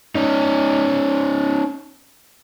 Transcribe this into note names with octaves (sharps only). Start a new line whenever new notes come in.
C#4 D#4